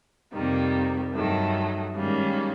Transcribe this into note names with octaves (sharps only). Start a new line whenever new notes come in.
F2 C3 D#3 G3 A#3
G2 D#3 F#3 A3
G#2 D#3 G3 A#3 C#4